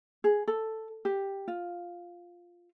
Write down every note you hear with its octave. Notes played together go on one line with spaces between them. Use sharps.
G#4
A4
G4
F4